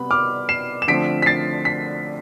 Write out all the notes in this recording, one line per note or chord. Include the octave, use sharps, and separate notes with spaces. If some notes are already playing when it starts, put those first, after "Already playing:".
Already playing: C3 G3 B3 B5
D6 F6
C7 E7
E7
D3 F3 A3 C4 B6 D7
B6
A6 C7
B6